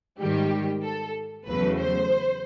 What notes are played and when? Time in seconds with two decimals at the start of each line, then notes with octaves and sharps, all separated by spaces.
0.20 G#2 D#3 G3 G4
0.83 A4
1.47 E2 C#3 F#3 A3 B4
1.79 C5